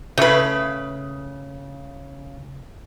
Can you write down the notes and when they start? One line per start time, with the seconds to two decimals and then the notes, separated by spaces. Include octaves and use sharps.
0.18 C#3 A3 B4